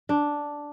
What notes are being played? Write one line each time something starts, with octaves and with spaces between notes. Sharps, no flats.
D4